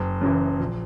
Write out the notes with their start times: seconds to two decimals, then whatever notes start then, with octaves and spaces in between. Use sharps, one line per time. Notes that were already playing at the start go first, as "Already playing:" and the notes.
Already playing: F#1
0.21 F#2 C#3 E3
0.59 A#1